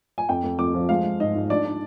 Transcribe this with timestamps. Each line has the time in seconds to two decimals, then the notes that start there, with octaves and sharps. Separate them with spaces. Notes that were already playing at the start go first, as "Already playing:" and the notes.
0.18 G#5
0.29 F2 G5
0.44 F2
0.59 F2 D6
0.74 F3
0.89 G#3 F5
1.04 G#3
1.20 G#2 D#5
1.35 G#2
1.50 D4 D5
1.65 D4